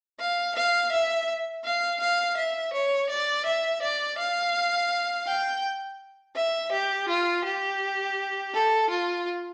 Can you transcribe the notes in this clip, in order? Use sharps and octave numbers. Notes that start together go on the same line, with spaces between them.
F5
F5
E5
F5
F5
E5
C#5
D5
E5
D5
F5
G5
E5
G4
F4
G4
A4
F4